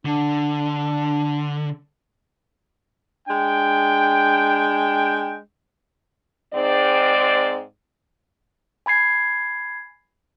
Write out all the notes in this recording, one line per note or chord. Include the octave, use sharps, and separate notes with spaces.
D3 D4
G#3 D4 G5
G#2 C4 D5
G#5 B5 G#6 C7